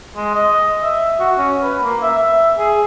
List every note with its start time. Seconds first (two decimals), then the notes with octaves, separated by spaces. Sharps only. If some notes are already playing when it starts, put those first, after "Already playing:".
0.16 G#3
0.35 D#5
0.83 E5
1.19 F#4
1.38 C#4
1.62 B4
1.83 A#3
2.02 E5
2.17 E5
2.58 G#4